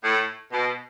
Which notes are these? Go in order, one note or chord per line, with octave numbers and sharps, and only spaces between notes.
A2
B2